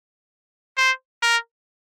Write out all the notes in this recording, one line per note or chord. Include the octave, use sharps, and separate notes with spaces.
C5
A#4